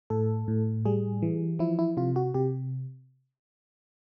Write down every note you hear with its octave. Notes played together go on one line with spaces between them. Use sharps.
A2 A4
A2
G3 G#4
E3
F3 E4
E4
C3 F4
F#4
C3 G4